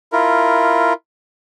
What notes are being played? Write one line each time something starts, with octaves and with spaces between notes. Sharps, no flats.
E4 F4 A#4